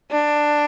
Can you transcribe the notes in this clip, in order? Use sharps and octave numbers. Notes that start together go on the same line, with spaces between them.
D4